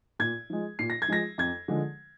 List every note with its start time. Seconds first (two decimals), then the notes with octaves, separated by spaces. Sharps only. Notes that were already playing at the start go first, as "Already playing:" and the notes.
0.19 A#2 G#6
0.50 F3 G#3
0.79 A#2 C7
0.90 A#6
1.02 G#6
1.08 F3 G#3 A#6
1.38 F2 G#6
1.68 D3 F3 G#3